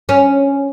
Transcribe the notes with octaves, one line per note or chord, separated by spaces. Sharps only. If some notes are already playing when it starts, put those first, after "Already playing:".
C#4